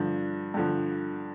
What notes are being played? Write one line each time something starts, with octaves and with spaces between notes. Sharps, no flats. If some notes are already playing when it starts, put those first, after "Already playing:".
Already playing: G2 D3 F3
G2 D3 F3